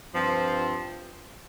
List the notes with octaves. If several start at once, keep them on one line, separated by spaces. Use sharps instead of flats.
G2 F3 C4